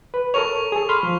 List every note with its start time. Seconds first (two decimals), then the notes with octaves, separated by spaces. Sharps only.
0.14 B4
0.34 A4 A#4 C#5 C#6 F7
0.72 G#4 A4
0.89 B5 C6 F6
1.03 F3